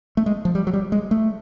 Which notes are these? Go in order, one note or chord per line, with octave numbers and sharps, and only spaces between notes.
A3
G#3
F3
G3
F#3
G3
G#3
A3